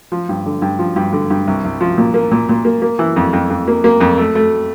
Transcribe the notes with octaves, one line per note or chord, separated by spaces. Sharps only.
F3
G2
D3
G2
F3
G2
D3
G2
C2
C2
F3
A#2
A#3
A#2
A#2
A#3
A#3
E3
F2
F2
F2
A#3
A#3
F2
A3
A3